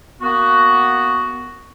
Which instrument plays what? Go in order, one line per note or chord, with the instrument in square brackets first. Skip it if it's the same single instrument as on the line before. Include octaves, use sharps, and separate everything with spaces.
[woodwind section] A#3 B3 F#4